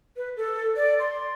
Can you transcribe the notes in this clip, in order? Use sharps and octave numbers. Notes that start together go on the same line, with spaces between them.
B4
A4
D5
C6